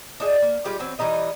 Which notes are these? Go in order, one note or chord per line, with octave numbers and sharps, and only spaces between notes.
D4 D#4 G#4
A#3
G3 G#3 F4 G4
E3 F#3 C4
E3 G3 D#4 D#5